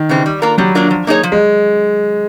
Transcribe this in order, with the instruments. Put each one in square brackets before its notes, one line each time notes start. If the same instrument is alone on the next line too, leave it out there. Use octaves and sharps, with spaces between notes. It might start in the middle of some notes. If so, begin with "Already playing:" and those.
Already playing: [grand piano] D#3
[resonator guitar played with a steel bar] C#3 E3 G3 C4
G3
A#3 D4 F4 A#4
[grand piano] F#3 [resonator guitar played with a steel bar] G3
[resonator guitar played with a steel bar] A#3 D4 F4 A#4
F3
A#3 D#4 G#4 C#5
F3
[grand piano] G#3